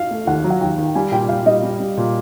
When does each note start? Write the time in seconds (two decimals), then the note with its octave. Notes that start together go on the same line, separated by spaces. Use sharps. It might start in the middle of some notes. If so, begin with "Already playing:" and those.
Already playing: F5
0.11 A3
0.27 D#2 F#5
0.44 F#3
0.50 F#5
0.61 D#2 G5
0.78 D#3
0.86 G5
0.95 G3 G#5
1.12 A#2 G5
1.29 A#2 F5
1.46 G3 D#5
1.63 G3
1.80 G3
1.97 A#2